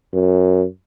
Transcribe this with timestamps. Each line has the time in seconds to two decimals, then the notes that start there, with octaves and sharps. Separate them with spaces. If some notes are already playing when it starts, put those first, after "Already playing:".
0.14 F#2